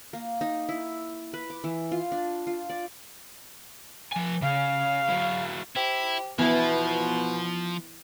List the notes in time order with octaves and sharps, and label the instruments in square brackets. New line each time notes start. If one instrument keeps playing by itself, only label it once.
[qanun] A#3
D#4
E4
B4
D6
E3
F4
D4
F4
D5
[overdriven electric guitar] F3 G#5
[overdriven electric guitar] C#3 [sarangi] F5
[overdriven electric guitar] F#3 E4
[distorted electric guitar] E4 [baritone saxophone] G4 [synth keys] C5
[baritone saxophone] B2 [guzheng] E3 E4 [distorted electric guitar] F3 [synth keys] B3